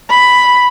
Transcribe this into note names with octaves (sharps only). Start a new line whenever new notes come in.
B5